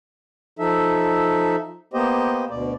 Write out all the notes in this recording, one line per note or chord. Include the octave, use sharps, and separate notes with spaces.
F3 D#4 A4 E5
A#3 B3 G4 C5 D#5
D2 B2 D5